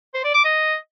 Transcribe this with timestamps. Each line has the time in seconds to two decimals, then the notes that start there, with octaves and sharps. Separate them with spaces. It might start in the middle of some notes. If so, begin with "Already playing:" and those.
0.14 C5
0.24 D5
0.34 D6
0.45 D#5